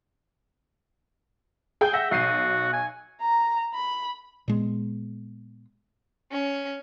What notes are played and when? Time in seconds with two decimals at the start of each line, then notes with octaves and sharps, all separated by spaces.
1.81 G#4 G5 G6
1.93 E5 F#5 A#6
2.11 B1 F#4 C7 D#7
2.73 G#5
3.22 A#5
3.74 B5
4.48 A#2 G#3 B3
6.31 C#4